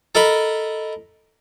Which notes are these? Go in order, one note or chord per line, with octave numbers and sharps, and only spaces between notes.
A4 A#4 D#5 B5